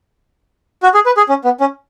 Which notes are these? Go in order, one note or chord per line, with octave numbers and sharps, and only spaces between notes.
F#4
G#4
B4
G#4
C#4
B3
C#4